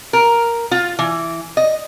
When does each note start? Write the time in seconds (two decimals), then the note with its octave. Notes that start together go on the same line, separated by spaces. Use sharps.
0.13 A#4
0.71 F4
0.99 E3
1.57 D#5